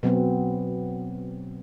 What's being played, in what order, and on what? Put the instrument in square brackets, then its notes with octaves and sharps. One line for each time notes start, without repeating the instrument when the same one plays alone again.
[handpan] B2 F#3 B3 C4